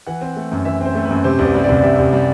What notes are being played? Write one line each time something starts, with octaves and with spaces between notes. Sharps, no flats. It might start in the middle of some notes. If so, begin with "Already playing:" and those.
E3 F#5
C4
A3
F#2
E3 E5
C4 C5
A3
B4
F#2
C3 C5
C2
B4
G3
D5
C2
D5
C3 E5
C2
G3